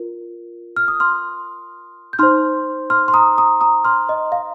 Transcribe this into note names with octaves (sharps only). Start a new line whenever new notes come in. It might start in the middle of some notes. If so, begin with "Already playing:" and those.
Already playing: F4 A#4
F6
D#6
C6 F6
G6
D#4 C5 C6 F6
C6 F6
C6
A#5 D#6
A#5 D#6
A#5 D#6
C6 F6
D#5
F5